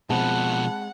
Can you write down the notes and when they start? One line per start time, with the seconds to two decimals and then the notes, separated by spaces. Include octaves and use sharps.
0.10 B2 F3 G#3 C4 F#5 A5 B5 F#6